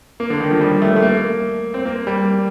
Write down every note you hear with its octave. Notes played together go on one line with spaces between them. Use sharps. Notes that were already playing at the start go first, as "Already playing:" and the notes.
A#3
D3
D#3
F3
G3
A3
A3
A#3
C4
A#3
G3